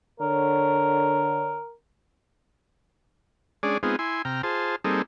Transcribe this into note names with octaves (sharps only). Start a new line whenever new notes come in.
D3 A#4 C#5
G#3 C#4 D4 G#4 D5
G#3 B3 C4 D#4 F4 G#4
E4 G#5 C6
C3 G5 A#5 F6
F4 G#4 C5 A5
G3 A#3 C4 D#4 G#4 A4